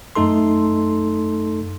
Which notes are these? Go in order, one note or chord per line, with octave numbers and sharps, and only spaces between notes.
F#2 A3 D#4 A4 C6